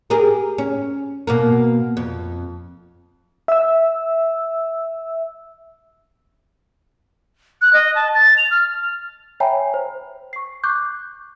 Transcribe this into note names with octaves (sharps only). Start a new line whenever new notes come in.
G4 G#4 A#4
C#4
B2 A#3 A#4
F2
E5 E6
F#6
D#5
A5
A6
F7
F6
C#5 E5 G5 G#5 A#5 B5
C5
C#6 C7
C#6 D6 F#6 G6